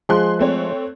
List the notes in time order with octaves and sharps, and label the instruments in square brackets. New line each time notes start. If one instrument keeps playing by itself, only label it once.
[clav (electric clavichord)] F3 G#3 [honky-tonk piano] G#4 C6 F#6
[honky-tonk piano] A3 C4 C#5